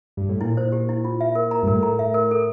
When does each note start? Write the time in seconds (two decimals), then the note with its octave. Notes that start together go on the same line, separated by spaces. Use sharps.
0.17 G2
0.29 A2
0.41 A#2 E4
0.57 C5
0.72 G4
0.89 E4
1.04 F4
1.21 E5
1.35 A#4
1.51 A#5
1.63 G2
1.67 A2 A#4
1.83 A#5
1.99 E5
2.14 A#4
2.31 A4